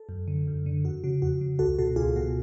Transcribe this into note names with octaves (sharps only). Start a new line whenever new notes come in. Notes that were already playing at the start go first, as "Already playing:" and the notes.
Already playing: A4
F#2
D3
F#2
D3
F2 F#4
C#3 F#4
F2 F#4
C#3
C#2 F#4 A4
B2 F#4 A4
C#2 F4 G#4
B2 F#4